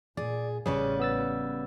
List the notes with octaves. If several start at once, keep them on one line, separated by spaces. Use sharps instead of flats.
A#2 G#4 D5
A1 C#3 G3 G#4 B4 C#5 D5
B3 E6 A6